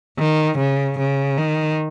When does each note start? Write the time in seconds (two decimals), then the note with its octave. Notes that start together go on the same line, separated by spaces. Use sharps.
0.19 D#3
0.58 C#3
0.99 C#3
1.38 D#3